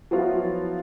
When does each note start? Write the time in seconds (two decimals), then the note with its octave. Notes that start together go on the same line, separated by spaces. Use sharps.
0.11 F3 F#3 B3 E4 F4